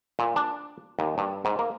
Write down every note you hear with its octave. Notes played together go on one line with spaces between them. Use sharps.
A#2
D4
D#2
G2
G#2
A#3